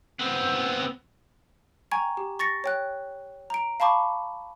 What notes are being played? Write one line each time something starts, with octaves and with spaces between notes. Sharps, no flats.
B3 C4
G5 G#5 A#5 C#6 G#6
G4
C#6 A6 A#6 C#7
C#5 G5 F#6
A#5 D7
F5 A5 B5 C#6 D6